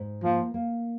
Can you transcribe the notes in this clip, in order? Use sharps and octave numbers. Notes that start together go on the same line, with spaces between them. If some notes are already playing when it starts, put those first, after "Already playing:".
Already playing: G#2
F3 A#3
A#3